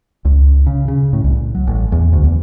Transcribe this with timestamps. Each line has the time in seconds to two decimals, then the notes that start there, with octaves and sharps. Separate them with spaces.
0.25 C#2
0.67 C#3
0.88 C#3
1.13 A2
1.24 C2
1.55 F#3
1.67 A1
1.92 E2
2.13 D2
2.24 E2